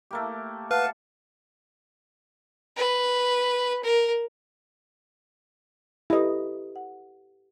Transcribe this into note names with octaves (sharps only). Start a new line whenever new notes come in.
A3 A#3 G4
B4 F5 F#5 A5
B4
A#4
E4 G4 A4 B4 D#5
F#5